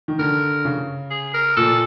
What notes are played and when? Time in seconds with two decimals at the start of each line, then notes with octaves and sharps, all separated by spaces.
0.08 D#3
0.19 D3 A#4
0.65 C#3
1.11 G#4
1.34 A#4
1.57 A#2 A4